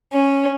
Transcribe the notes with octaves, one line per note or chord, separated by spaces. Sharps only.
C#4